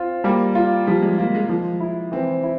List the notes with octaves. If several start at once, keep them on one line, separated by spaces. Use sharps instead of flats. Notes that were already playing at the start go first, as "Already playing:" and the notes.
Already playing: C4 F4
G3 A#3
F4
F3 G3
G#3
A#3 F4
G#3
F3 G#3
E4
E3 C4
E4